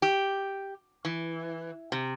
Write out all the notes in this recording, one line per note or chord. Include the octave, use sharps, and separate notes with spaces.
G4
E3
C3